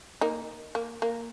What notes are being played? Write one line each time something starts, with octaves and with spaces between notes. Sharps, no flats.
A#3 D#4
A#3
A#3